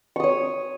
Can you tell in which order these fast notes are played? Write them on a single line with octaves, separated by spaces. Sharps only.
C#6 D#6 C#5